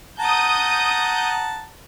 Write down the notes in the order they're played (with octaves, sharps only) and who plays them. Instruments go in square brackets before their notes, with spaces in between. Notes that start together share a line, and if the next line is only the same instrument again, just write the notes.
[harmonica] F#5 A5 A#5 [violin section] D#6 G6